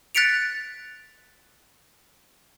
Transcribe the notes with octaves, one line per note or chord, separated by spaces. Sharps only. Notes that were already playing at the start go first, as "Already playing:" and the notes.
F#6 A6 B6 C#7 D7 F7